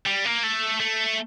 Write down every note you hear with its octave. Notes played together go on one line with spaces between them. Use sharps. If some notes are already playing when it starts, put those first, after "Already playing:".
G3
A#3
A3
A3